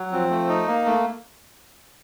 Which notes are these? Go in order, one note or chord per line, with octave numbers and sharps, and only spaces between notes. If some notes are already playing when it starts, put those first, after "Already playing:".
Already playing: F#3
F3 C4
A3
D#4
A#3
A3